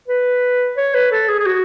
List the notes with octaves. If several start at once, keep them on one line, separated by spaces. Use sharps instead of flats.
B4
C#5
B4
A4
G#4
G#4
F#4